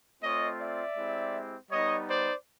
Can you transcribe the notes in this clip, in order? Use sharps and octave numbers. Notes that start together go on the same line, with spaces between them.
A3 C4 F4 C#5 D#5
D5 E5
G#3 C4 E4 G4
G3 B3 D#4 C#5 D#5
C5 D5